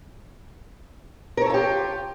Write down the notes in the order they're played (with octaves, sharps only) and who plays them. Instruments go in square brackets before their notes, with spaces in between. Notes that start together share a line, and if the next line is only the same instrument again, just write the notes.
[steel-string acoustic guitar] A#4
C#5
A4
F4
G4